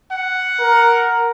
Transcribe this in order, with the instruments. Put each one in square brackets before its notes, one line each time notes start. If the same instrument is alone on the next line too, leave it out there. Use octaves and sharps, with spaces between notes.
[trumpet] F#5
[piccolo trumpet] A#4